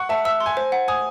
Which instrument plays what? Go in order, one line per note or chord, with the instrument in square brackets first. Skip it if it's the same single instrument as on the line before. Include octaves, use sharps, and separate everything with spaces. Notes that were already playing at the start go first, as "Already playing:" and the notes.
Already playing: [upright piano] F#5 [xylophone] C#6
[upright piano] E5 [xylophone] A5
[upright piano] E5 [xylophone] E6
[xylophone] C6
[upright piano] G#5
[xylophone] C5
F#5
[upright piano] G#5 [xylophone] D#6